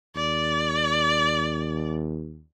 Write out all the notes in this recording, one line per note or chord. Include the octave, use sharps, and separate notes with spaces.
D#2 D5